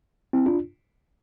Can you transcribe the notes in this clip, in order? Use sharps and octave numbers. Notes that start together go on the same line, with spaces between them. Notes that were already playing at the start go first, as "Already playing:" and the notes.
C4 E4
D4 F4